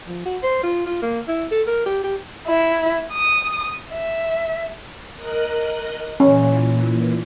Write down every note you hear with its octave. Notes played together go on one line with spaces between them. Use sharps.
F3
F#4
C5
F4
F4
A#3
E4
A4
A#4
G4
G4
E4
D#6
E5
A#4 D#5 F#6
A#2 E3 C#4